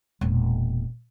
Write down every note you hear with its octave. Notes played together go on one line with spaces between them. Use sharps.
E1 A#2